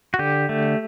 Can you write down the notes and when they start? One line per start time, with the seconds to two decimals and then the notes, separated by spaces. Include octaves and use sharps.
0.14 F#4
0.19 D3 G4
0.49 A3